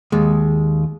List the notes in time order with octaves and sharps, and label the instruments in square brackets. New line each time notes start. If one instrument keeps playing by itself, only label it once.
[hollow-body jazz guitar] D#2 G#3